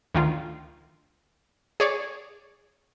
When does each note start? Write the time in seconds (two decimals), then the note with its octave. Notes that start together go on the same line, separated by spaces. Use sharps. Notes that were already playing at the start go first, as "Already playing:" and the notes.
0.14 D2 D#3 F4
1.80 G#4 C#5 D5